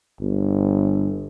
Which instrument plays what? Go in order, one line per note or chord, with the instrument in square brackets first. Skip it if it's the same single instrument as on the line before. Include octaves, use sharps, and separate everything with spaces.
[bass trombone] G1